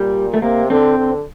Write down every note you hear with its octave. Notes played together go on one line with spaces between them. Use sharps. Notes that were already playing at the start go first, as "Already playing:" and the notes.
Already playing: A#2 G3
A3
C3 A#3
D3 C4
D3